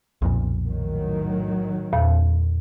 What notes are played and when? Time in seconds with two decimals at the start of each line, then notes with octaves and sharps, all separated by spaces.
0.22 B1 F2 A#2
0.63 A2 D#3 F#3
1.93 E2 A#2